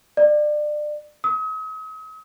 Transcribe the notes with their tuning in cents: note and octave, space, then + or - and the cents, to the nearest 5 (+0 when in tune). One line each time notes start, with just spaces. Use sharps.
D5 +30
D#6 +45